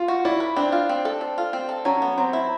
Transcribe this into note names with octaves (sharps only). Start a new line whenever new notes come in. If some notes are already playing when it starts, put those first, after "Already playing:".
Already playing: F4
F#4
E4 D5
B4
C4 D4
F4
C4
A4
C4
F4
C4
A4
F#3 C#4
B3
F#3 C4
E4